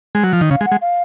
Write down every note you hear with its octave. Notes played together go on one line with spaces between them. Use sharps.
G#3
F#3
F3
D#3
C#3 F5
G#3
F#5
G#3
F5